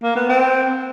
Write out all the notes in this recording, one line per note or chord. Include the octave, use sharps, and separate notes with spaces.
A#3
B3
C4